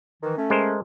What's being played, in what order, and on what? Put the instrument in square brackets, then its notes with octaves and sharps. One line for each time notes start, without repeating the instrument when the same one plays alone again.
[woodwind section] D#3 E3
A3 C#4
[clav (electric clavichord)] G#3 A#4 C5